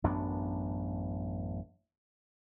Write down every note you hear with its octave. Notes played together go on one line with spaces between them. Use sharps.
A1 F#2 B3 D4